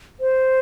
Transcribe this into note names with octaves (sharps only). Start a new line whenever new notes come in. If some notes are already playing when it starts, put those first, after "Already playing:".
C5